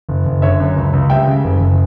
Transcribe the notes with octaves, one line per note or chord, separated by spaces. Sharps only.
F#1
F#1
D3 C#5 E5
F#2
C#2
C#2
G3 E5 G5
C#3
F#1
F#1